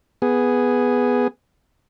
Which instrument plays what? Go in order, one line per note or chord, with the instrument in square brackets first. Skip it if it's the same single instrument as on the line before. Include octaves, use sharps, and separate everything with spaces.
[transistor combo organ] B3 G#4